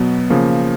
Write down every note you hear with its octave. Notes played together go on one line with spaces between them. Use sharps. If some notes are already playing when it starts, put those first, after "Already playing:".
Already playing: B2 F#3 B3
C#3 F3 A#3